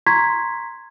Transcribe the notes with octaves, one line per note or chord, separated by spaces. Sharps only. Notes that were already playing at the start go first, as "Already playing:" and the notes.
A#5 C6 C#6 G#6 B6